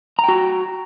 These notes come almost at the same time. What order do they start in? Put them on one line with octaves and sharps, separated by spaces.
A#5 G5 F#4